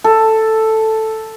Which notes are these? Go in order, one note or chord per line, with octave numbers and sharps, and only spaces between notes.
A4